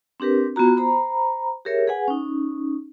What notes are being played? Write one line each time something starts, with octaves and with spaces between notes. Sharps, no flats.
C4 D4 G4 A#4 B4
B3 F4 F#4 A#5
C5 A#5 B5
G4 G#4 A#4 C#5 E5
G#4 B4 F#5 G#5
C#4 D#4